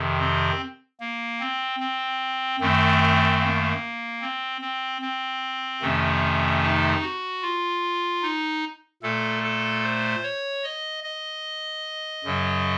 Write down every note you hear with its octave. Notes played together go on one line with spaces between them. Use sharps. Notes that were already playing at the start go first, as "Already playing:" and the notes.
Already playing: F2 C3 D#3
C4
A#3
C4
C4
F#2 D#3 A3 C4
A#3
C4
C4
C4
F2 C3 D#3 A3 C#4
D#4
F#4
F4
D#4
A#2 A3 A4
A4
C5
C#5
D#5
D#5
F#2 C#3 F#3